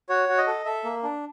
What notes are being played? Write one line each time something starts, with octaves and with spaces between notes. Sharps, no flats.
F#4 C#5
F#4
D#5
A4
A4 E5
A#3
D4